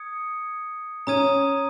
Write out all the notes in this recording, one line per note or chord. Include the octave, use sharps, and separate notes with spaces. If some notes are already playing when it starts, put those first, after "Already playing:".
Already playing: D#6 G#6 C#7
C#4 A#5 D#6 G#6 D#7